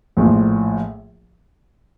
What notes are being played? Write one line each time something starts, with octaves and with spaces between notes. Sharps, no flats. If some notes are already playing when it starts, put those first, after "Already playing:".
A#1 A2 F3